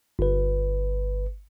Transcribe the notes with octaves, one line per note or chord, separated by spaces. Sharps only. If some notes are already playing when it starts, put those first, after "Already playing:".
G1 B4